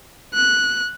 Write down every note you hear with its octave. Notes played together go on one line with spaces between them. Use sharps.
F#6